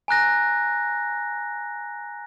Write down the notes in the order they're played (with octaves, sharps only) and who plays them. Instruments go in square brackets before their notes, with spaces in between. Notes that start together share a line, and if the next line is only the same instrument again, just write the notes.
[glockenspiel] G#5 A#5 F#6 A#6